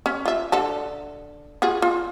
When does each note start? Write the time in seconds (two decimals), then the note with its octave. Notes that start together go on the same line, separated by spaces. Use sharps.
0.06 C#4
0.25 F4 E5
0.52 D3 A4 A5
1.62 F4 F#4 G#4
1.82 F4